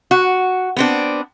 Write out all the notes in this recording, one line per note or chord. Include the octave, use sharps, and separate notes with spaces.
F#4
B3 C4 D4